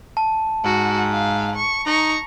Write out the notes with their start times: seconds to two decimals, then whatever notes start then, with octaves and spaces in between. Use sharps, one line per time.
0.17 A5
0.65 G#2 F#4
1.12 F5
1.55 C#6
1.86 D#4 A#5 C#6